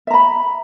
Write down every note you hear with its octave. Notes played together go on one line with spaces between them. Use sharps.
E5 A#5 B5